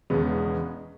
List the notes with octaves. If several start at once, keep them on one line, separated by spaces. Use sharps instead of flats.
E1 E2 C#3 G#3 B3